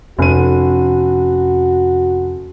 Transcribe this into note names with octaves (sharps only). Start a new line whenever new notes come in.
F1 F2 C#4 F#4 D#7